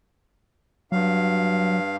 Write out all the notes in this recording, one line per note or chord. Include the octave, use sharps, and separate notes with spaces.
G2 F#3 F5